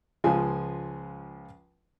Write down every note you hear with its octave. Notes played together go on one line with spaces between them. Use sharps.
C#2 F3 G#3 G#5